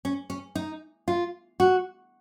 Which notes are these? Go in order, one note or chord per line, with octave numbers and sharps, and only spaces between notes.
C#4
C#4
D#4
F4
F#4